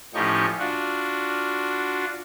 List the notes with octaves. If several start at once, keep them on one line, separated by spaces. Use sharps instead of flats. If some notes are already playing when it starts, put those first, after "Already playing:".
A2 F3 C#4 D#4 G4 C#6
D4 F4 F#4